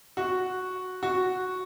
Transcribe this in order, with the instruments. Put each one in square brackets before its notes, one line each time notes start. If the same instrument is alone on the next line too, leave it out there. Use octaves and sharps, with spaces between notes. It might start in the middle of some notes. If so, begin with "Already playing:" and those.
[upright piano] F#4
F#4